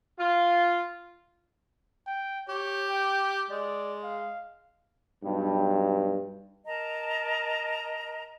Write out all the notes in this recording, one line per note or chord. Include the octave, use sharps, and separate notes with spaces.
F4
G5
G4 C#5
G5
G#3 D5
F5
B1 G2
A#4 D#5 A5 A#5